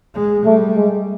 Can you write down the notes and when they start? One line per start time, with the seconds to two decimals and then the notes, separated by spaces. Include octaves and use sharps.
0.14 G#3
0.45 G3 A3
0.76 G#3